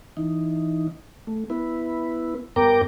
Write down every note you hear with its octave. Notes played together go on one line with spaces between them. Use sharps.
E3 D#4
A3
B3 E4 B4
G2 B3 A#4 G5 A#5 D6